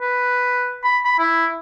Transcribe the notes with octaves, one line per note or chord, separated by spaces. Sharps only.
B4
B5
B5
E4